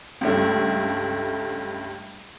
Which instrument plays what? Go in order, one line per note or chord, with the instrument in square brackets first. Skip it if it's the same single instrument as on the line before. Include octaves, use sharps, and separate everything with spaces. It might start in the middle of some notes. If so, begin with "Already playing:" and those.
[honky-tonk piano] C#2 G2 A3